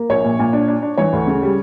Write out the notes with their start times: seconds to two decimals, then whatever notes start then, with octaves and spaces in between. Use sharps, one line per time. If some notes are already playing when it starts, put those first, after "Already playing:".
Already playing: A#3
0.09 A#1 C#5
0.24 A#2
0.39 A#2
0.53 D4
0.68 D4
0.82 D4
0.98 E3 C#5
1.13 D2
1.27 C#3
1.42 G3